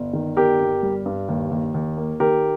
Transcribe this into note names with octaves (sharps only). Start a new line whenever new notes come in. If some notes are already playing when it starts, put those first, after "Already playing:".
Already playing: G1
D#3
G1 G4 A#4
G1
G3
G2
D#2
D#2
D#2
A#3
D#3 G4 A#4